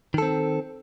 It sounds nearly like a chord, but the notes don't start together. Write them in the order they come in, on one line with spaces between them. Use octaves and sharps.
D#3 A4 C4